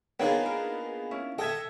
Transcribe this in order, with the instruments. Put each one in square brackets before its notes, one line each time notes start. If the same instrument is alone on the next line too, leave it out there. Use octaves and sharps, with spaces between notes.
[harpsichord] A#3 D4 F4 [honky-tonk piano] B3 D#4 G#4 [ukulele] C#5 G5
[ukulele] A#4
C#4 E4
[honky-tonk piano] A4 G#6 [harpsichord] D#5 E5 [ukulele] G5